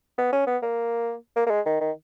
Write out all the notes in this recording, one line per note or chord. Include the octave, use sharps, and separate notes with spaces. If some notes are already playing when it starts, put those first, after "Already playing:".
B3
C#4
B3
A#3
A#3
A#3
G#3
D#3
D#3